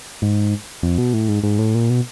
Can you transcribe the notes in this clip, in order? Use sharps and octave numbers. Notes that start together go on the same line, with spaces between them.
G#2
F2
B2
A2
G#2
G#2
A2
A#2
B2